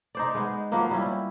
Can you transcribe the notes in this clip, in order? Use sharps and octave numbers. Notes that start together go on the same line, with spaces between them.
D#4 C5 D5
G#3 B3
F3 F#3 A#3 B3
G3 C#4 E4